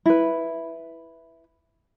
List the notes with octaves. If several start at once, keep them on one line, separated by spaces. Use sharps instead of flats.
E4 B4